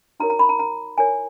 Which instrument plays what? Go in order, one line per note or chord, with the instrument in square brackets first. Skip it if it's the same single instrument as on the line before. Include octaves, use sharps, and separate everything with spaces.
[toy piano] D#4 F#4 A#4 C#5 A#5
A#5
B5
A#5
A#5
E4 A#4 C#5 G#5